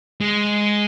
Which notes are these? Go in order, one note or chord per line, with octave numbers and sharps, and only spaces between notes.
G#3